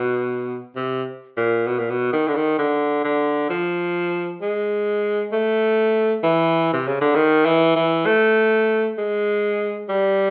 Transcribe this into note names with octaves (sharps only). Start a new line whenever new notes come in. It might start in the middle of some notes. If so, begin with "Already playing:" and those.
Already playing: B2
C3
A#2
B2
A#2
B2
D#3
D3
D#3
D3
D3
F3
G#3
A3
E3
C3
C#3
D3
D#3
E3
E3
A3
G#3
G3